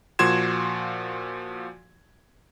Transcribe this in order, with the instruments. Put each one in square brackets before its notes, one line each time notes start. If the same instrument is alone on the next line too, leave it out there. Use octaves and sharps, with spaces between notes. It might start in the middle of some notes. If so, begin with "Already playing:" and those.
[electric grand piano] A#2 F3 F#4 C6 G#6 E7